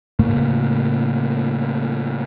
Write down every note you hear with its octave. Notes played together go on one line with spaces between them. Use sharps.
A2 C#3 A3 A#3